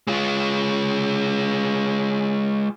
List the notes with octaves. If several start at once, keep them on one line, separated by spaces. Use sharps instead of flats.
G#3 F4